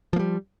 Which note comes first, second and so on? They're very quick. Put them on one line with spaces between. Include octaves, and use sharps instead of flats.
F3 A#3 G3